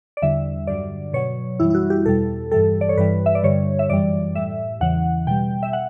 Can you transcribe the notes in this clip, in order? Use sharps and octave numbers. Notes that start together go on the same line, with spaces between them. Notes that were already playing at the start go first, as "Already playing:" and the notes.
D5
E2 D3 G3 E5
G2 D3 F#3 D5
B2 F#3 C#5
F#2 E3 G3 E4
E4
F#4
G4
E2 B2 G3 A4
G2 E3 G3 A4
D5
C#5
G2 E3 G3 B4
E5
D5
G2 D3 G3 C#5
E5
F#2 E3 G3 D5
A2 G3 E5
E2 C#3 E3 F#5
B2 G3 G5
E5
F#5